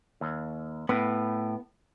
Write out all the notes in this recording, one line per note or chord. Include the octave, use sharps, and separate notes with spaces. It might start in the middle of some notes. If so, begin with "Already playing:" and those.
D#2
A2 B3